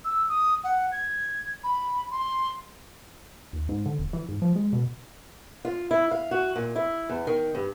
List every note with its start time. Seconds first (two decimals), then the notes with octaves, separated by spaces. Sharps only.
0.05 E6
0.29 D#6
0.64 F#5
0.92 G#6
1.64 B5
2.11 C6
3.53 D#2
3.69 G#2
3.86 D3
3.99 E1
4.13 E3
4.29 G#2
4.42 F3
4.56 G#3
4.73 B2
5.65 F4
5.91 E4
6.11 F5
6.31 F#4
6.56 A#2
6.76 E4
7.09 E2
7.27 D#3
7.55 G2